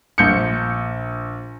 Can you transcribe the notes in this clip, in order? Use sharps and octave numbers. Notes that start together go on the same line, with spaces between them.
A#1 G6 C#7